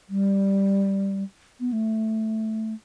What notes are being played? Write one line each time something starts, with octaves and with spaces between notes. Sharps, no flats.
G3
B3
A3